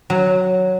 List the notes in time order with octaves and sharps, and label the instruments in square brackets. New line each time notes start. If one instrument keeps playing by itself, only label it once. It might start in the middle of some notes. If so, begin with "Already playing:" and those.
[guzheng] F#3